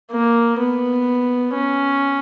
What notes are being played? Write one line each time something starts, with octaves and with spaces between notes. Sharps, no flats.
A#3
B3
C#4